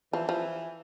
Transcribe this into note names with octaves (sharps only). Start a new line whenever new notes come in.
E3 F3
F3